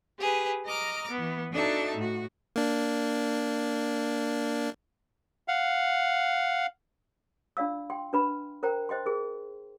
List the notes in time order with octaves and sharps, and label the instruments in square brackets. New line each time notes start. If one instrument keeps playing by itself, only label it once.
[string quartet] G4 G#4 B4
D#5 A#5 D6 F6
E3 B3
D4 D#4 F#4 A4 E5 A5
A2 F#4
[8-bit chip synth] A#3 D4
[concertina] F5 F#5
[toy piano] D4 F4 D5 F5 E6
G5 C6
D4 B4 B5
A#4 C5 G5 A#5
C5 D#5 G5 C6
G#4 A#4